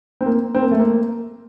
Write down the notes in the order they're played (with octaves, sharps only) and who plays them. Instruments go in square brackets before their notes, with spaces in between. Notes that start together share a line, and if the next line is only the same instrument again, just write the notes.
[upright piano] C4
A#3
C4
A#3
A3
A#3